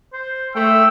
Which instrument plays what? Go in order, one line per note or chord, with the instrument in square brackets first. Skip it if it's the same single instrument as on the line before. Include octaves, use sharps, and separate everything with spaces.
[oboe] C5
[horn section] A3 [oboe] G5 [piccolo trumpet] E6